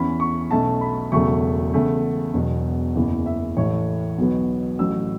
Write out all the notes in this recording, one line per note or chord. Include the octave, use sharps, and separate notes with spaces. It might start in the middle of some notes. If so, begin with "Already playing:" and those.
Already playing: E2 E3 C#4 B5
C#6
B1 B2 A3 C#4 A5
B5
E1 E2 C#3 F#3 A3 C#6
E2 C#3 A3 C#4
E1 E2 B2 F#3
F#1 E2 C#3 E3
E5
A1 A2 E3 A3 C#5
B1 B2 F#3 B3
A1 A2 F#3 C#4 E6